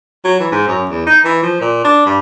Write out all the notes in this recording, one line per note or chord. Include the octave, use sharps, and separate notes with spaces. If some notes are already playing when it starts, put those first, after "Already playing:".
F#3
E3
G#2
F#2
E2
D#4
E3
F3
A#2
D4
G2